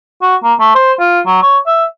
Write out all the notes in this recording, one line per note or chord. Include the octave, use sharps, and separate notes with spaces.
F#4
A#3
A3
C5
F4
F#3
C#5
E5